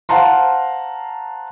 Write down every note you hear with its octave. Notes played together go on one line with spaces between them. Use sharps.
C5 F5 F#5 A5 A#5 C6